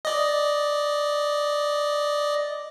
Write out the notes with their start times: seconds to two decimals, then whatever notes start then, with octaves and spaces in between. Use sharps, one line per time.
0.05 D5 D#5